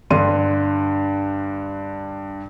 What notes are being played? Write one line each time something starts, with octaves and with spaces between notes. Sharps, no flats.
G2 D3 C6 D#7